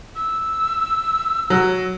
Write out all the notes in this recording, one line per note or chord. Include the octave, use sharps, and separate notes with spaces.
E6
F#3